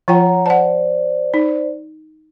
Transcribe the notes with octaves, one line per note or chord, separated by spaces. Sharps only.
F3 F4 C#5 F#5 G5 A#5
C5 D5 F#5 A5
D#4